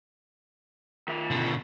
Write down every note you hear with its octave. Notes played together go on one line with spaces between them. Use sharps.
D#3 E5
B2 D3